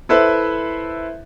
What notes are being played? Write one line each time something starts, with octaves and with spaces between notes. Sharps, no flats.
E4 A4 B4 C5 E5